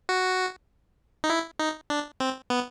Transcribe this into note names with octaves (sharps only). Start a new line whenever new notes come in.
F#4
D#4
E4
D#4
D4
C4
B3